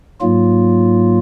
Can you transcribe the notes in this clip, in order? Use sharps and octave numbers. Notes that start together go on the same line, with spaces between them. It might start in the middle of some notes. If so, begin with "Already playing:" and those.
G#2 F#3 A#3 F4